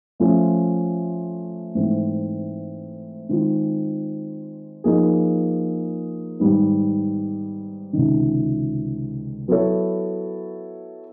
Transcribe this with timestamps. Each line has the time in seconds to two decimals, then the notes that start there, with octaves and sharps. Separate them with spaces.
0.20 F3 A3 C#4 F4
1.75 G#2 E3 A3 C4
3.29 D#3 G#3 C4 F4
4.84 F3 A#3 D#4 G#4
6.39 G#2 D#3 G3 B3 D#4
7.93 C#2 C3 D#3
9.48 F#3 B3 E4 A4 C#5